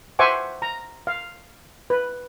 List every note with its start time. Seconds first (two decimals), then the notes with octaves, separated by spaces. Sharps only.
0.19 C5 E5 F#5 G#5 C#6 D6
0.62 A#5
1.07 F5
1.90 B4